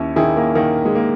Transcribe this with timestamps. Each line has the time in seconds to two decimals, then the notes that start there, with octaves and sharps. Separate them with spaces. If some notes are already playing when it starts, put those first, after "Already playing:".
Already playing: D#2 C#4 E4
0.16 D#3 E4 G#4
0.37 A#3
0.55 D#3 A#3
0.85 G#3
0.95 A#3